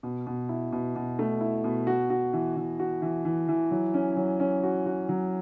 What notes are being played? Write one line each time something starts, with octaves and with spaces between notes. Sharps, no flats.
B2
B2
E4
B2
B2
A3
E4
B2
F#4
F#4
E3
E3
F#4
E3
E3
E3
F#3
C#4
F#3
C#4
F#4
F#4
F#3